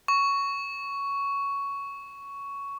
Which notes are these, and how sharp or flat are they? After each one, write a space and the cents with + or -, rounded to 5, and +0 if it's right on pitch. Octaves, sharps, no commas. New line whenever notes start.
C#6 +10